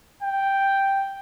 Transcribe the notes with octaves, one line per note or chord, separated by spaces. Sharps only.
G5